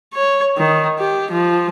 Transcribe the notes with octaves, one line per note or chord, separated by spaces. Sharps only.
C#5
D#3
G4
F3